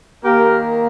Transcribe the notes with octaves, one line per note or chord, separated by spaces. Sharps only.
D#3 A#3 G4 A#4